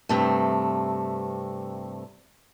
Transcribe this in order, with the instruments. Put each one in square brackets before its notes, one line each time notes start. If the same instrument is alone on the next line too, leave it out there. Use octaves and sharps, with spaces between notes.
[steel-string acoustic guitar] G2 C3 A3